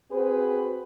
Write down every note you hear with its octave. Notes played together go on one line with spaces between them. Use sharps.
C4 F#4 G#4 B4 C5